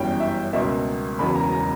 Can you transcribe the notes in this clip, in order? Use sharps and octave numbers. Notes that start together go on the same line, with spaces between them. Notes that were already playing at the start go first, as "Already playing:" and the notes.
Already playing: G1 F#2 E3 G3 G5
E5
C#2 B2 A#3 E5
E1 E2 C#3 F#3 A#3 B5
A#5
A#5